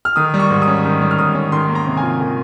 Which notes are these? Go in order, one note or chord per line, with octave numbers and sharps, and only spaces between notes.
F6
D#3 D#6
G3
C#6
G#2
D#6
C#4
D#3
G3
F6
G#2 D#6
C#4
D#3 C6
A#3
A#5
C3
G#5
F4
D#3